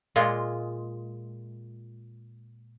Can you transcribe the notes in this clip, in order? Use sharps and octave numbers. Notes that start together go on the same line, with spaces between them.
A#2 G#3 F4